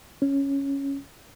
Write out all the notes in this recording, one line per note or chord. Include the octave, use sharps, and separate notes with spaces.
C#4